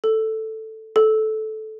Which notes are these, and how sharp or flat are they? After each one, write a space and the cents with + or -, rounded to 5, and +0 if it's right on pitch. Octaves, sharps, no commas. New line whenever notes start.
A4 +0
A4 -15